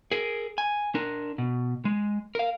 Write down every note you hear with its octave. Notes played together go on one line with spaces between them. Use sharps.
G#4 A#4
G#5
D4 A#4
B2
G#3
A#4 F5